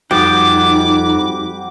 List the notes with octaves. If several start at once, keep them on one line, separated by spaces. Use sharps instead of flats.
F2 G3 D#4 F#4 G5 D6